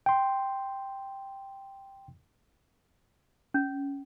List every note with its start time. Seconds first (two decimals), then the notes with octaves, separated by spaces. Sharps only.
0.06 G5 C6
3.54 C#4